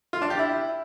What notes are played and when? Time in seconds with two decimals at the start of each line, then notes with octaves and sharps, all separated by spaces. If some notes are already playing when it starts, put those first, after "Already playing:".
0.13 F4
0.22 D4
0.30 G4
0.39 E4